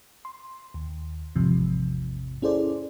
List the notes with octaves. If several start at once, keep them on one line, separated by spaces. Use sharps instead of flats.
C6
D#2
A1 E2 G#2 C3 F3
C#4 E4 G#4 A4 C5 D5